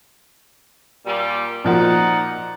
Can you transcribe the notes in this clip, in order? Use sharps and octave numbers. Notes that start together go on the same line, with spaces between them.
A#2 G3
A#2 F3 D#4 F#4 D5 F#5